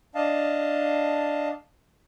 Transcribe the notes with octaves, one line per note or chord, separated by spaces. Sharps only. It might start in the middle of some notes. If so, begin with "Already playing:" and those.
D4 D#5 F5 A5